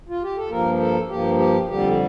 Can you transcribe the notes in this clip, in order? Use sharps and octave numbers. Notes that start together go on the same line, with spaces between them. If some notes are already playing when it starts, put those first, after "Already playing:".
F4
G4
A4
G2 F3 A#3 A#4
A4
G2 F3 A#3 G4
G4
F2 D3 G3 G4